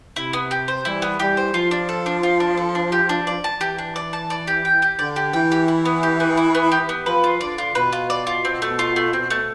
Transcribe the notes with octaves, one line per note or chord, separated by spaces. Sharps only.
C3 E4
B3
G4
C5
E3 G3 E4
B3
E3 G3 G4
C5
F3 F4
D4
A4
D4
F4
D4
A4
D4
G4
D4
D5
A5
E3 G4
D4
D5
A5
D5
G4
G5
G4
D3 D5
G4
E3 G5
G4
E4
B3
G4
B3
E4
B3
G4
B3
F3 B4
F4
D3 D5
F4
B2 B4
F4
D5
F4
C4
A3
F4
A3
C4
A3